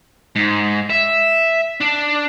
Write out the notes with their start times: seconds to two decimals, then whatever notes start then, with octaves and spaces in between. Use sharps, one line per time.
0.36 G#2
0.90 E5
1.80 D4